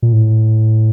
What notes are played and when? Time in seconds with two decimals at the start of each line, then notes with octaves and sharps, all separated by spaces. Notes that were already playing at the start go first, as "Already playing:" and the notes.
0.02 A#2
0.13 A2